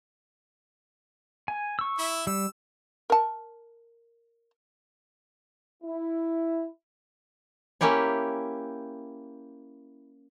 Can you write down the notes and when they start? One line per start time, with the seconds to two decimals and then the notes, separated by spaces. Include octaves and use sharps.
1.48 G#5
1.79 C#6 E6
1.98 E4 E5
2.27 G3 E6
3.10 A#4 A5
5.83 E4
7.81 A#3 C#4 E4 G4 C#5